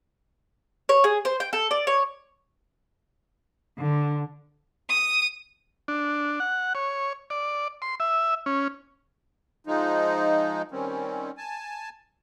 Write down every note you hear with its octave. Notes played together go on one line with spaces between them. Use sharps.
C#5
G#4
C5
G5
A4
D5
C#5
D3
D#6
D4
F#5
C#5
D5
C6
E5
C#4
F3 G#3 D#4
D#3 G3 C4 C#4
G#5 A5